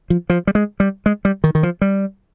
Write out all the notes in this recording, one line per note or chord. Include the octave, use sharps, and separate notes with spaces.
F3
F3
G3
G#3
G3
G#3
G3
D#3
D#3
F3
G3